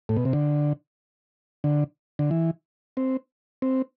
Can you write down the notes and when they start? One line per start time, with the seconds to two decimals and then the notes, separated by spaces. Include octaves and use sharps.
0.09 A2
0.17 B2
0.25 C3
0.33 D3
1.64 D3
2.19 D3
2.31 E3
2.97 C4
3.62 C4